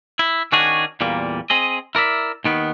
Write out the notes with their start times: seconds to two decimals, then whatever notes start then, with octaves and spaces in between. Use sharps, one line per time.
0.19 E4
0.52 D#3 C#4 D4 F#4 G#4
1.01 E2 A#2 G3 A#3
1.50 C4 G#4 D#5
1.95 E4 A#4 D5 E5
2.44 D#2 D#3 B3